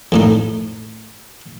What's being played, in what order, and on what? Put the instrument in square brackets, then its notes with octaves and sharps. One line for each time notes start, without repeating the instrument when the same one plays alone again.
[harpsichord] F2 A2 D#4